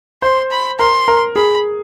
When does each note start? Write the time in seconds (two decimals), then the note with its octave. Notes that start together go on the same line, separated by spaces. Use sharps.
0.22 C5 C6
0.51 B5
0.79 A#4 C6
1.08 A#4
1.36 G#4 B5